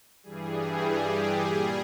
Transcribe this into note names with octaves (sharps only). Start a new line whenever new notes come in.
G2 E3 G3 G#4
G4
A#2 G3 G#4